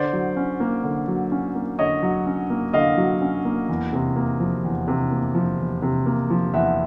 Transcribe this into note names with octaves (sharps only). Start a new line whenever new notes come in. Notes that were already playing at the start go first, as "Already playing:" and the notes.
Already playing: D3 C5 D5
F#3
C#4
A#3
D3
F#3
C#4
A#3
D3 C#5 D#5
F#3
C#4
A#3
D3 D#5 F5
F#3
C#4
A#3
E2
C3
A#3
F3
E2
C3
A#3
F3
E2
C3
A#3
F3
E2 E5 F#5